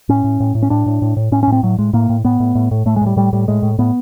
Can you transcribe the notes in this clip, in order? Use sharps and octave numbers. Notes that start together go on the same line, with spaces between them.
A2 C#4
A2
A2
A2
C#4
A2 D4
A2
A2
A2
A2 C#4
C#4
A2 C4
A2 F#3
A2 G#3
A2 A#3
A2
A2 B3
A2
A2
A2
A2 A3
G#3
A2 G3
A2 G3
A2 G3
A2 G#3
A2
A2 B3